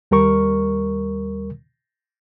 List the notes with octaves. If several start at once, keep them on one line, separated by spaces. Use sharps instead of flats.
D#2 G3 A#4 C#6